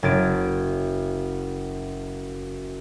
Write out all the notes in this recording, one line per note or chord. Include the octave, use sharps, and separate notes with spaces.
F#1 G#6 A6 D7